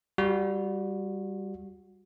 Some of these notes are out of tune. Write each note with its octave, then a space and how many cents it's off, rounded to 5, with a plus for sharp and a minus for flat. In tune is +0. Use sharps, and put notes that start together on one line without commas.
G3 +0 F#4 -25